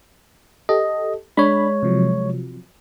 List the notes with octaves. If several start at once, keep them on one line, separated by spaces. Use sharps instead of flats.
G4 A4 D#5
G#3 D4 C#5 B5
C3 F3 F#3